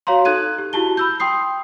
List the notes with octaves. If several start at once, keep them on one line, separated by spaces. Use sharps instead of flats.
F#4 C#5 F5 A#5 C6
D#4 A4 F#6 G#6 D#7
G4
E4 F#4 G4 A5 G7
B5 E6 G6
G5 C6 D#6 C7